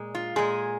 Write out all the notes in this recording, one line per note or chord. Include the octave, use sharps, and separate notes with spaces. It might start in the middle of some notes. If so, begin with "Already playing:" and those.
Already playing: A#2 G#3
F4
A#2 G#3 G#4